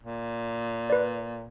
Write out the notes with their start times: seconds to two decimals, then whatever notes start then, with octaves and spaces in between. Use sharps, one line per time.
0.03 A#2
0.90 B4 D5